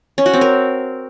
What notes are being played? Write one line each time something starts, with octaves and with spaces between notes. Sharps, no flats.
C#4
F#4
C4
A#4